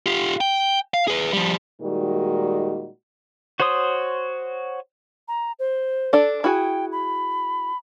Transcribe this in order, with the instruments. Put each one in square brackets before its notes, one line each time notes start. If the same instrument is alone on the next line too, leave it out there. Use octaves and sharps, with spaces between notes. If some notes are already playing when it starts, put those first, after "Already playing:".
[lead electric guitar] F4 G4
G5
F5
G#4 B4
F3 G3
[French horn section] A#2 D#3 G3 G#3 D#4 F#4
[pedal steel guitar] F#4 C5 C#5 C6 D#6
[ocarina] A#5
C5
[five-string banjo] D4 A4 D5
[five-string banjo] E4 F#4 G#4 [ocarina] G5
[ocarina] B5